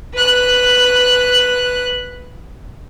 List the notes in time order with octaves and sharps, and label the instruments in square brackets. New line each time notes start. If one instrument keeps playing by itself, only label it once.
[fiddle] B4 F#6